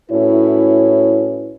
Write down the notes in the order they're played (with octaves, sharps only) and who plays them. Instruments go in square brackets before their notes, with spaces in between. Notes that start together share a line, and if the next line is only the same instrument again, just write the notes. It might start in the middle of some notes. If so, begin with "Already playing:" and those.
[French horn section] A2 C#4 E4 F#4 B4 C#5